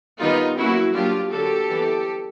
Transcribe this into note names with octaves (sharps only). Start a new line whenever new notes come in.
D#3 G3 B3 D#4 F4
F#3 A#3 C#4 E4 F#4
F#3 A#3 D4 F4 G4
D3 F#3 A#3 G4 A4
E3 G3 B3